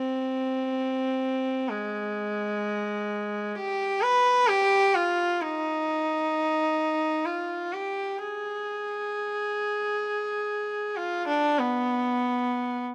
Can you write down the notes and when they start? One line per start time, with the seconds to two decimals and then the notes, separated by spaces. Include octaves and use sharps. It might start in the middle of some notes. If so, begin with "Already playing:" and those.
Already playing: C4
1.69 G#3
3.55 G4
4.02 B4
4.47 G4
4.95 F4
5.41 D#4
7.26 F4
7.73 G4
8.19 G#4
10.96 F4
11.28 D4
11.59 B3